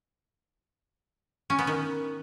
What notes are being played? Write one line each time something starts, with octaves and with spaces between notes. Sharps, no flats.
C#4
B3
D#3